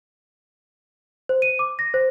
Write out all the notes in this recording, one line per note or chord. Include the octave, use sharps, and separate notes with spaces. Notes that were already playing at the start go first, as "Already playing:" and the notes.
C5
D#7
D6
A#6
C5